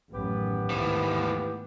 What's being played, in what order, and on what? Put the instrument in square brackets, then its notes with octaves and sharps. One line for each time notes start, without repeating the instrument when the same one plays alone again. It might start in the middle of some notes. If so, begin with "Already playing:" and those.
[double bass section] A1 F#2 D#3 [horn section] B3 G4 B4
[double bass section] D#2 G#2 A3 [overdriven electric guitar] E3 F3